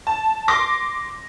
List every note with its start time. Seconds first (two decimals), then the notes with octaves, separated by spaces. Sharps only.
0.07 A5
0.48 C6 D6 A#6